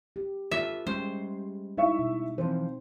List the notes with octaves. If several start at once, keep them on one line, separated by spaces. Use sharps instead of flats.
G4
F4 A4 B4 E5
G3 G#3 C#4 C5
D#4 E4 E5 C#6
B2
E3 F3 C4 C5